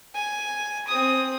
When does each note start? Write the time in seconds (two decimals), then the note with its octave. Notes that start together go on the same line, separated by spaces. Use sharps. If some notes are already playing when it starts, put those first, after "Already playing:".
0.14 G#5
0.88 C4 D#6